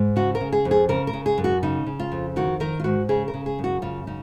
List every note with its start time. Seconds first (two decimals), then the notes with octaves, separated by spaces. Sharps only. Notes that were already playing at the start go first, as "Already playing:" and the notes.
Already playing: G#2
0.16 C#3 F#4
0.35 A#4
0.41 C#3
0.52 G#4
0.65 F2
0.71 G#4
0.89 C#3 A#4
1.07 A#4
1.13 C#3
1.26 G#4
1.38 F#2
1.44 F#4
1.63 C#3 D#4
1.86 C#3
2.00 F4
2.12 F2
2.36 D#3 F#4
2.60 D#3 A#4
2.80 F4
2.84 G#2 F#4
3.09 C#3 G#4
3.28 A#4
3.34 C#3
3.46 G#4
3.59 F#2
3.64 F#4
3.82 C#3 F4
4.07 C#3 D#4